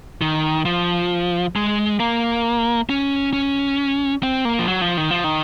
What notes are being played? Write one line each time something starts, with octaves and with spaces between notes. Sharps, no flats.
D#3
F3
G#3
A#3
C#4
C#4
C4
A#3
F3
F#3
F3
D#3
F3
D#3